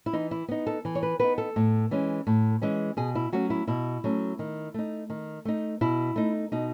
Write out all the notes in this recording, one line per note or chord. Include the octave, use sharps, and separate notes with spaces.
E4
E3 D#4
E4
B3 D#4
A4
E3
C#5
B4
B3 D#4 B4
A4
A2
E3 G#3 C#4
A2
E3 G#3 C#4
B2 G#4
E4
F#3 A3 C#4 F#4
E4
B2 E4
F#3 A3 C#4
D#3
A3 D#4
D#3
A3 D#4
B2 E4
A3 D#4
B2 D#4